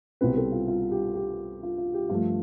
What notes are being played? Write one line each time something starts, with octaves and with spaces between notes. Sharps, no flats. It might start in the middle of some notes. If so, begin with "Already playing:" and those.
C2 B2 G3 C4 B4
A4
F4
F4
G4
G4
F4
F4
G4
G2 F3 A3 F4